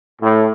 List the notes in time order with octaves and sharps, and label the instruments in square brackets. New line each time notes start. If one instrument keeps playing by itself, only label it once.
[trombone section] A2